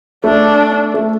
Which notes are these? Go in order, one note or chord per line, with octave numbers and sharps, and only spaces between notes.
A3 D4
A3